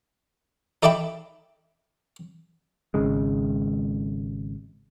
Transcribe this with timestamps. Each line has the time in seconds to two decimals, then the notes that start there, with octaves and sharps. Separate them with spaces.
0.83 D#4 A4 D5 E5 G5 B5
2.94 G#1 C#3 G#3